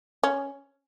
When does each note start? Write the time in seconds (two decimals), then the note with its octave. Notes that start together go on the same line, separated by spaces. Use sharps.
0.23 C#4